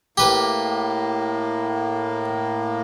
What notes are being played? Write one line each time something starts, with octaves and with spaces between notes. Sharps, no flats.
A2 A#3 G4 B4